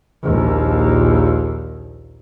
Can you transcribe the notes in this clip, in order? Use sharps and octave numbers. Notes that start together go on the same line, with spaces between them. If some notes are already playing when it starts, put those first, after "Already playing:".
A#1 D#2